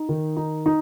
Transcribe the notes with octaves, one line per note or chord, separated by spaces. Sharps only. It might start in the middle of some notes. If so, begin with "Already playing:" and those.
Already playing: D#4
D#3
D#4
D#4